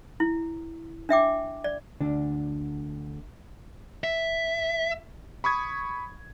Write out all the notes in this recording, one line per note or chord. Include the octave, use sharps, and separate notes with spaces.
E4
D4 E5 G5 D6
D5
D2 D3 D4
E5
B5 C#6 D#6 G#6